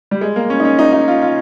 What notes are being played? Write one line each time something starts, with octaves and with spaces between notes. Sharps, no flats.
G3
G#3
A#3
C#4
D#4
C#4
D#4
D#4
F4
F4